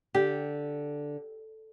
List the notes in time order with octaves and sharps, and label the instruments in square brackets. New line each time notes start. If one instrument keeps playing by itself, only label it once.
[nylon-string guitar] D3 [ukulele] G4